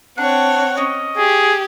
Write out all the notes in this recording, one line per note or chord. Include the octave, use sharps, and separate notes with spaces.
C4 D4 C#5 F#5
C#4 D#5
G4 G#4